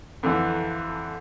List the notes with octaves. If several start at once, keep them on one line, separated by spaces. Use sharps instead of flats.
F2 D3 E3